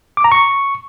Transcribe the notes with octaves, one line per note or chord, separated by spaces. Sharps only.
D6
A#5
C#6